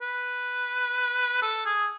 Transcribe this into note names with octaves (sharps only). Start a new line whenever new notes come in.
B4
A4
G#4